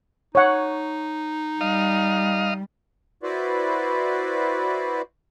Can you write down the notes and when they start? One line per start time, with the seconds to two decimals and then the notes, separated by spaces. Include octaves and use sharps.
0.35 D#4 C#5 F#5
1.61 G3 D#5 F5
3.23 E4 F#4 B4 C5 D5